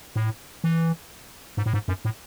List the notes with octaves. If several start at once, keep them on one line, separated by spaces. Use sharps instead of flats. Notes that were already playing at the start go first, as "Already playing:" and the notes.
A2
E3
G#2
A2
G#2
F#2
A2